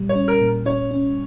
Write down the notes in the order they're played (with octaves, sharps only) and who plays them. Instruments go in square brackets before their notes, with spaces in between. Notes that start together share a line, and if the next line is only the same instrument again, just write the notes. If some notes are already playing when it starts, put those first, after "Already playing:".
Already playing: [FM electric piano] A#2 G3
[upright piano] C#5
[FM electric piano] C#4
[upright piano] A#4
[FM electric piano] A#2
[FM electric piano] C#4 [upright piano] C#5
[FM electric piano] C#4